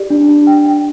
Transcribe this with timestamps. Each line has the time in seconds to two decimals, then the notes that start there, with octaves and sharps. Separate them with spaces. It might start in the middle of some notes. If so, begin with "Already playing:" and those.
Already playing: G4 D5
0.10 D4
0.28 D4
0.47 G5
0.66 G5